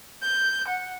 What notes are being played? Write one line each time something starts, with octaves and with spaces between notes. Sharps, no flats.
G6
F#5